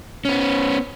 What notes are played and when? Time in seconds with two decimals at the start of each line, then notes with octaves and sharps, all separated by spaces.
0.25 B3 C#4